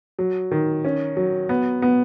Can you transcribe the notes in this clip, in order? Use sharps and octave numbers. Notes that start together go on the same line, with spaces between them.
F#3
D#3
C#4
F#3
B3
B3